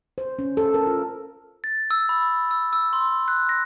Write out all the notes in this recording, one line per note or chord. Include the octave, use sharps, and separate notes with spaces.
C5
C#4
A4
A#4
F4
A6
E6
B5
E6
E6
C6
F#6
A#6